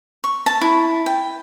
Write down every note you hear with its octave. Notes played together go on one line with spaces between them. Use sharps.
C#6
A5
E4
G5